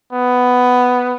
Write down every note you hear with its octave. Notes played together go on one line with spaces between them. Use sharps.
B3